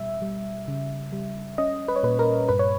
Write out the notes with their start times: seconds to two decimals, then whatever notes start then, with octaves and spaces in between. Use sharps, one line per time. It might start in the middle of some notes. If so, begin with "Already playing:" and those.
Already playing: B2 G3 E5
0.22 G3
0.68 C#3
1.12 G3
1.58 C#4 D#5
1.88 B4
1.96 C#5
2.03 A#2 B4
2.19 A#4
2.49 G2 B4
2.59 C#5